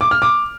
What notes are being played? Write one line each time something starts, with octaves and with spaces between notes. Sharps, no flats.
D6
F6
D6